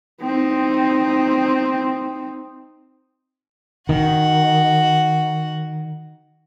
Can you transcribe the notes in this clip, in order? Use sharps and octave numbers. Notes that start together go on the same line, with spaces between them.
C4 D#4
D#3 F#4 F#5